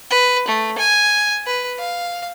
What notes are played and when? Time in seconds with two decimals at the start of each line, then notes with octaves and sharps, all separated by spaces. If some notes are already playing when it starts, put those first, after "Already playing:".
0.10 B4
0.48 A3
0.78 G#5
1.46 B4
1.79 F5